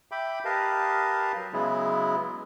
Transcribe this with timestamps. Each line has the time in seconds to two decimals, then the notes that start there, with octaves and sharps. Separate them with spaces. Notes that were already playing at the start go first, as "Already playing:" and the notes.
0.11 E5 G5 B5 D6
0.45 G4 A#4 B4 D#5 F5 A5
1.36 F#3
1.53 C#3 F#3 G#3 B3 E4